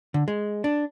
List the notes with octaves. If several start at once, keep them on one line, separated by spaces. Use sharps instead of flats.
D3
G#3
D4